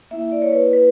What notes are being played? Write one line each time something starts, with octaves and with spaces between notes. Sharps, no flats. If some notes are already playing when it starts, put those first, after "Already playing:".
A#3 E4 E5
E5
D5
C#5
B4
B4